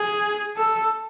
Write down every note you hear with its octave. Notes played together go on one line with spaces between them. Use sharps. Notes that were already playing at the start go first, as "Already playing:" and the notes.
Already playing: G#4
A4